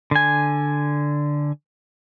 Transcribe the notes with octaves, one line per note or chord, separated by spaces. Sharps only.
D3 G#5